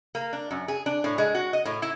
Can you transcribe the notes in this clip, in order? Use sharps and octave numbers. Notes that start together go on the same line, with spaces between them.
A#3
D4
F#2
G#4
D4
A2
G#3
F#4
D#5
A2
E4